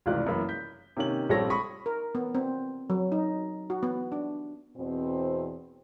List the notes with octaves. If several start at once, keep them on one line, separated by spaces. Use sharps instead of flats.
F1 C#2 E3 F4 D5 F#6
F#2 E3 A#3 B5
G6 B6
C3 D#3 A#3 C#4 F#7
A#1 G3 C4 A4 C#5 A#6
B5 C#6 D#6 B6
A#4
B3
C4
F#3
D#4
F#4
B3
D4
E2 B2 C4